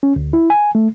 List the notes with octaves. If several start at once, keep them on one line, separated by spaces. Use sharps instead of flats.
C#4
D2
E4
G#5
A3